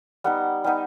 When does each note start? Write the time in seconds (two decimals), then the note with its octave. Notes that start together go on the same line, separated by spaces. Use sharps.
0.24 G3 B3 D#4 F#5
0.64 G3 B3 D#4